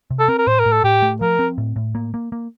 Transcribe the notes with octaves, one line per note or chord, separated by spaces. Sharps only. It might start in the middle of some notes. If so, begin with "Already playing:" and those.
C3
A4
C4 A#4
A#4
A2 C5
A#4
A2
A4
A2 G4
A3
F3 A#4
C4
A2
A2
A#3
A#3
A#3